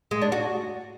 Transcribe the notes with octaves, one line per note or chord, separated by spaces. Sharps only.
G#3
D4
F#4